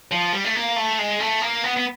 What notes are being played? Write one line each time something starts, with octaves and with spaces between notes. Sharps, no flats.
F3
G3
A3
A#3
A3
G#3
A3
A#3
B3
B3